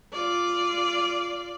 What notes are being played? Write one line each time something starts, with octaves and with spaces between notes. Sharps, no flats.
F4 D5